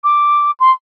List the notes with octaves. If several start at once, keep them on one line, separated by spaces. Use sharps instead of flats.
D6
C6